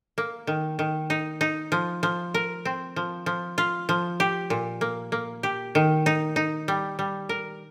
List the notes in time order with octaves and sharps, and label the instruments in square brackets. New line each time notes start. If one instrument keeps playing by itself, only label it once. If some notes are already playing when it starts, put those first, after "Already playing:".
[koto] A#3
D#3
D#3
D#4
D#4
F3
F3
A#4
C4
F3
F3
F4
F3
G4
A#2
A#3
A#3
G4
D#3
D#4
D#4
G3
G3
A#4